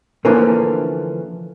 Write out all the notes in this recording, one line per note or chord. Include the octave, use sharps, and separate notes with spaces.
D3 E3 F3 A3 A#3 C#4